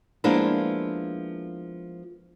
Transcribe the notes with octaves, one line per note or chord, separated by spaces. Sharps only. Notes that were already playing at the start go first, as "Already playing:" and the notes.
F3 G#3 A#3 B3 D4 E4